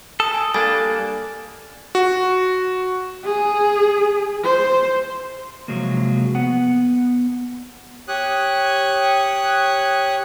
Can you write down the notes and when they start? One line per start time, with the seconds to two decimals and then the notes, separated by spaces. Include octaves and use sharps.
0.20 A4 D#6
0.34 G#5
0.54 G3 A#3 D4 A4 G#5 A6
1.95 F#4
3.25 G#4
4.44 C5
5.68 C3 F3 F#3 G#3 A#3
6.35 B3 F#5
8.08 G4 C#5 D#6 F#6